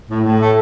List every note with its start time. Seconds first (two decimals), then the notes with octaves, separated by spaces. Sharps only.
0.09 A2
0.24 A2
0.40 A3